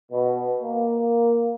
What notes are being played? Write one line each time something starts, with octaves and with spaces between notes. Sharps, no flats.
B2
A#3